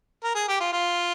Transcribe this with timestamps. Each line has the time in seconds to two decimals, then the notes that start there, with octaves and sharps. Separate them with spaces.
0.24 A#4
0.35 G#4
0.48 G4
0.60 F4
0.73 F4